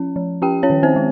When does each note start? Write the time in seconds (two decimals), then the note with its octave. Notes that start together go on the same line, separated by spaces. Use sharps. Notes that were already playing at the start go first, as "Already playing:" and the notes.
Already playing: F3 C#4
0.16 F3
0.42 C#4 G4 G5
0.63 C#4 C#5
0.70 D#3
0.83 C4 C5
0.96 G#3